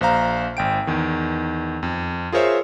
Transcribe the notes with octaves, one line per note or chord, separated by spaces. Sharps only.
A#1 C5 F5 A#5
G#1 G5 D7
E2 D#3
F2
F4 G#4 A#4 C5 C#5 E5